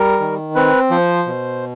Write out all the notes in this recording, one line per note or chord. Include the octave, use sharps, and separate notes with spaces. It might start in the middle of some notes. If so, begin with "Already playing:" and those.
Already playing: G3 A#4
D#3
C4 B4
F3 C5
B2